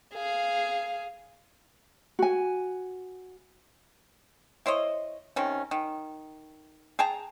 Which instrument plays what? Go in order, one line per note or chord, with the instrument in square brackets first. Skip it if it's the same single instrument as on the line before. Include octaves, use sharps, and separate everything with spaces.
[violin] G#4 F5
[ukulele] F#4 G#5
[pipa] E4 C5 C#5 D#5
C3 D#3 C#4
D#3
G#4 G5 A5 A#5